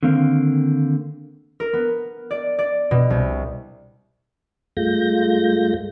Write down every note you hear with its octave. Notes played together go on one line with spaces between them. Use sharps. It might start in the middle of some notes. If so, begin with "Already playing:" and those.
D3 D#3 A#3 C4 F5
A#4
B3
D5
D5
B2
C2
G2 G#3 A3 F4 G6 A#6